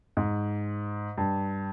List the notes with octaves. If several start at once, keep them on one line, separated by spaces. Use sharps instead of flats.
G#2
G2